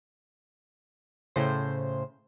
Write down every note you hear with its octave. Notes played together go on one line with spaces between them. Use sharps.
A2 C#3 C5